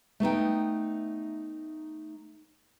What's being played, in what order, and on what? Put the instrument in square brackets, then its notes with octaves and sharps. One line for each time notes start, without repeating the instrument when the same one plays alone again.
[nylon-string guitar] A3 B3 D#4 G5